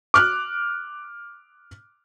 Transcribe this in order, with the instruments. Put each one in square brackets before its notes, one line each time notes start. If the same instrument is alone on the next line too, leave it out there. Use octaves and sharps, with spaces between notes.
[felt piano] D6 F6 F#6